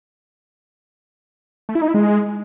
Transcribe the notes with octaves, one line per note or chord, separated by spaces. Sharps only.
A3
E4
D#4
E4
G#3